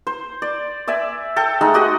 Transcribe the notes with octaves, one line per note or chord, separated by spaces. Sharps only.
C5
D5
D5 E5 G#5
A4 G5
G#3 A3 D#4 F#5
F#4 G4 D#5 F#5